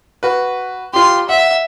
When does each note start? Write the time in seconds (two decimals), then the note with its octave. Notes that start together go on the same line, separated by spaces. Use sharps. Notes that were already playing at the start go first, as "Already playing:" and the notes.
0.23 F#4 B4
0.94 F4 G4 C6
1.29 E5 F#5